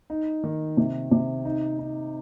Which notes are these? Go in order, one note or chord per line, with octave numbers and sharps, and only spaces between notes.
D#4
D#3
C3
C3
D#4
D#4